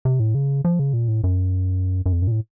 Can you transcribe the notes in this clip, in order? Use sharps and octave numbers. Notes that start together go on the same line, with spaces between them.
C3
A2
C#3
F3
C#3
A#2
A2
F#2
F#2
F2
F#2
A#2
A2